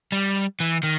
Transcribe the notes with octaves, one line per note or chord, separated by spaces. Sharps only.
G3
E3
D#3